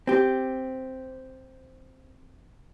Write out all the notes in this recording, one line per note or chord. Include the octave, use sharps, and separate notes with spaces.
C4 G4